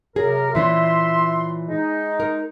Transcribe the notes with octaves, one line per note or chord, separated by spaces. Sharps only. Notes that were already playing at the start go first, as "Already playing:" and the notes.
F#2 C3 G#4 A#4
A#2 E3 C#4 E5 C6
G#3 D#4
A#4